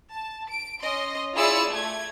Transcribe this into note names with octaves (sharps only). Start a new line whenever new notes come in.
A5
D7
C#4 D#5 C6
E4 F4 G#4 D5 E6 C#7
A3 G#6